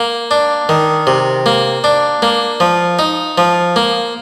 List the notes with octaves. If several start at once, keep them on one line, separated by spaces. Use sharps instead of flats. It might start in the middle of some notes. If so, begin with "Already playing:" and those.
Already playing: A#3
D4
D#3
C3
A#3
D4
A#3
F3
D#4
F3
A#3